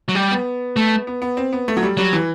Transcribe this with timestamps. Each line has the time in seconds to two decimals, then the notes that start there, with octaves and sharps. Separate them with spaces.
0.09 F#3
0.15 G3
0.31 B3
0.76 A3
1.07 B3
1.22 B3
1.37 C4
1.53 B3
1.68 A3
1.77 F#3
1.83 G3
1.97 F#3 G3
2.13 E3